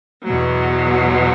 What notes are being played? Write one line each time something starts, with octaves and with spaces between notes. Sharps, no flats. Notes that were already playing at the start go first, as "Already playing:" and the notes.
E2 B2 F#3